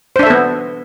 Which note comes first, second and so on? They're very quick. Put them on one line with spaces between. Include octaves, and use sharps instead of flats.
C5 D4 E5 A4 B3